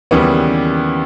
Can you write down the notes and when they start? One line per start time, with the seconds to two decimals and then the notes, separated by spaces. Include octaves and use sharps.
0.11 D#2 C#3 E3 G3 B3